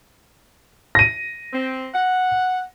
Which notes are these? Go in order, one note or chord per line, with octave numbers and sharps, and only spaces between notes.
A#6 D#7
C4
F#5